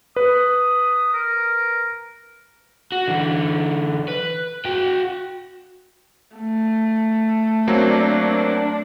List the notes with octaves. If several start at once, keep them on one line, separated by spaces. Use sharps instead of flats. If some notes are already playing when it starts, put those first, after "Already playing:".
B4 D#6
A#4
F#4
D3 E3
B4
F#4 G5
A3
F#3 A#3 C4 D4